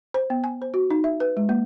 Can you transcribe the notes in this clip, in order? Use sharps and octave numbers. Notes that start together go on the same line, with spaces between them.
C5
B3
G#5
C5
F#4
D#4
E5
B4
G#3
A#3